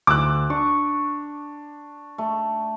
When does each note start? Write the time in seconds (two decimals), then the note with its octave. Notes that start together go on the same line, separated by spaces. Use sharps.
0.07 D2 D6 E6 F#6
0.50 D4 C#6
2.18 A3